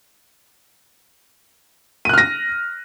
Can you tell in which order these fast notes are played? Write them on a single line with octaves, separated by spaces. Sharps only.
D#7 F#6 F6 A#6